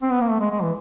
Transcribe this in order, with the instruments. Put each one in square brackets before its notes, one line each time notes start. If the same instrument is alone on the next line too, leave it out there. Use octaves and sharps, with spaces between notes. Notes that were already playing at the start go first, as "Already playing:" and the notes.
[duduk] C4
B3
A#3
A3
G#3
G#3
E3